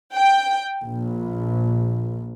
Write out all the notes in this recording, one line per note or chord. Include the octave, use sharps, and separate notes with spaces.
G5
A#1